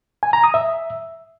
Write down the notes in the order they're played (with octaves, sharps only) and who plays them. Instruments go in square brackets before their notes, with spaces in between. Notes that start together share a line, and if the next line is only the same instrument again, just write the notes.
[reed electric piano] G#5
A#5
D#6
E5